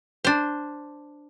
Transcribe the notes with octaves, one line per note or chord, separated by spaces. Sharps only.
D4 C5